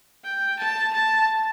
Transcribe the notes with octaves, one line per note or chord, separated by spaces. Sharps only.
G5
A5
A5